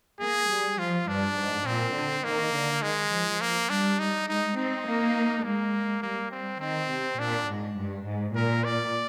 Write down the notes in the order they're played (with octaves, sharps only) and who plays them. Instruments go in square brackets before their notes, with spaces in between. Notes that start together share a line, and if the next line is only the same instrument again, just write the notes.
[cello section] A#3 [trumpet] G#4
[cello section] G3
[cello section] F3 [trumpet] F4
[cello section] G2 [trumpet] D4
[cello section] G#2
[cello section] A#2 [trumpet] C4
[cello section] D3
[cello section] D#3 [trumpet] A#3
[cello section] D3
[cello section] D#3 [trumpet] G#3
[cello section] F3
[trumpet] A#3
[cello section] G3 [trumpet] D4
[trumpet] D#4
[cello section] G#3 [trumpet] D#4
[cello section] C4 [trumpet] D#4
[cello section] A#3
[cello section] G#3 [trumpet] A#3
[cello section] G3 [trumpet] A#3
[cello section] G3 [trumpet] C4
[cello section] D#3 [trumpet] C4
[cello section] C3
[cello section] A#2 [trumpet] D4
[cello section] G#2
G2
G#2
[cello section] A#2 [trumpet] A#4
[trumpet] D5